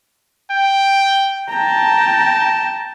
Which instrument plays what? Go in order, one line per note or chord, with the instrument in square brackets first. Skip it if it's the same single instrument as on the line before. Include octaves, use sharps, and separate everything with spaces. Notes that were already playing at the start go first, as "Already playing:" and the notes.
[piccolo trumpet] G5
[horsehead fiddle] G5 A#5 [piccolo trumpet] A5